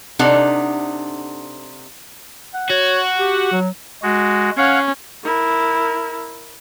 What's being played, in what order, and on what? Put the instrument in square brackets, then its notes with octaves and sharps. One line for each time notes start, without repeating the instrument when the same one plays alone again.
[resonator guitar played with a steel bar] C3 D4 D#4 A4 F#5
[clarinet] F#5
[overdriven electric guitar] F#4 [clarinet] C#5
[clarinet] G4
F#3
[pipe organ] G#3 F#4
[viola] C#4 [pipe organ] C#5 F5 F#5
[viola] E4 A#4